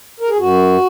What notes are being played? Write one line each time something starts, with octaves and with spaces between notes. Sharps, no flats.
A#4
G#4
F#2 F#4